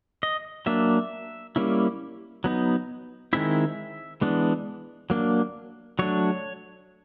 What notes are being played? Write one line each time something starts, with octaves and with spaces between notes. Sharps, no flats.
D#5
F#3 A#3 D4 E5
G3 A#3 C#4 E4
F#3 B3 D#4
D#3 G#3 C4 E4 E5
E3 G#3 B3 D4
F#3 A#3 D4
F#3 A3 D4 C#5